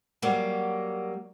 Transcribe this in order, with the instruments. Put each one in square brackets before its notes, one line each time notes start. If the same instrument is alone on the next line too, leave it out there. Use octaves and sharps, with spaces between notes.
[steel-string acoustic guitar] F#3 G3 A#3